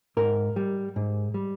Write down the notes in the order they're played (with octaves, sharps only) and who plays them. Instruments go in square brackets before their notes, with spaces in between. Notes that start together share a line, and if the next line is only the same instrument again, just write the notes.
[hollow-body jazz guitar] G#2 A#4
G3
G#2
G3